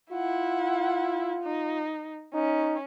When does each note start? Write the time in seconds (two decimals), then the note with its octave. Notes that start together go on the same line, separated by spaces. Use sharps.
0.11 E4 F4 F#5
1.43 D#4
2.34 C#4 D#4